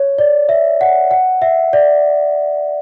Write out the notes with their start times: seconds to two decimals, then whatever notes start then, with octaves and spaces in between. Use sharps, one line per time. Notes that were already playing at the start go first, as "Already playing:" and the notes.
Already playing: C#5
0.18 D5
0.49 E5
0.81 F#5
1.11 F#5
1.42 E5
1.73 D5